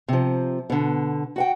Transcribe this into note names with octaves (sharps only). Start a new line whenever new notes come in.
C3 F3
B2 D3
F#4 F#5 G5